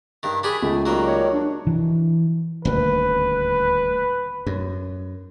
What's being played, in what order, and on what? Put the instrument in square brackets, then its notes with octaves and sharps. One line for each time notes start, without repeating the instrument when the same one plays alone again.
[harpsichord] G2 D#3
[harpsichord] D4 G4 G#4 [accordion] G#5 B5
[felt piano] C#2 [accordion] A3
[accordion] D#3 G3 [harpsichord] F#3 A#3
[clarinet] C#5
D4
[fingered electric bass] E3
[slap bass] D#1 D2 [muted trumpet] B4
[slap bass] F#2